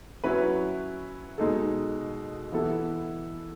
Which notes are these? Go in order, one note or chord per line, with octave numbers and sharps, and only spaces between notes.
F#3 C#4 E4 B4
B2 G#3 D#4 A4
E3 B3 E4 A4